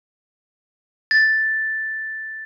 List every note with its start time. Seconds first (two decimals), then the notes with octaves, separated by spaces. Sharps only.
1.11 A6